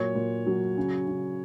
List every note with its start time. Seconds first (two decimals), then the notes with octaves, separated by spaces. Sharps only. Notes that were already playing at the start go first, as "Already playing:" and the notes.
Already playing: A#2 F#3 C#5
0.15 A#2
0.47 F#3
0.77 C#3
1.08 C#3